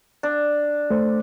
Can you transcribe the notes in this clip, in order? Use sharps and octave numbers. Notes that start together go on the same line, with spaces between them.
D4
A3 C5